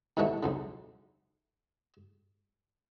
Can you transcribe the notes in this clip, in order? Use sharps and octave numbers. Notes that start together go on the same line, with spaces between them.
D#2 G#2 B2 E3 A3 C#5
B1 F2 C#3